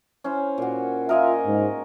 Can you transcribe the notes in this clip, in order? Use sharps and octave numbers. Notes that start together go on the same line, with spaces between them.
C#4 E4 C5
A#2 F#4
F4 A#4 D#5 E5 G#5
G#2